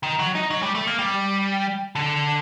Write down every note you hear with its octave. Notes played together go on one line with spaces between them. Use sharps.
D#3
F#3
D#4
F#3
G3
A3
A#3
G3
D3